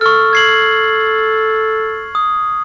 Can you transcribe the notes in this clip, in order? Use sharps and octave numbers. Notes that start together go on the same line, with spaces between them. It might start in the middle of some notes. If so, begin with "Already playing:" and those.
A4 C#6 F6
G#6 C7 F#7
D#6